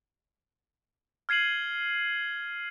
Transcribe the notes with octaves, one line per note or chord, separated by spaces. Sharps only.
F6 G#6 C7 D#7 F#7